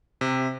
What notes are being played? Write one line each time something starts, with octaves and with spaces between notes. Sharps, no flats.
C3